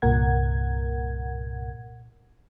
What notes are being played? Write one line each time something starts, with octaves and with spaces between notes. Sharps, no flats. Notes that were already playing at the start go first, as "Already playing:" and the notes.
C2 G2 A#2 A#4 F#5 G#6